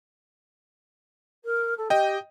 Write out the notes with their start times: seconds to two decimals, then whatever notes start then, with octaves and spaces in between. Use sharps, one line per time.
1.44 A#4
1.77 A4
1.90 G4 D#5 G5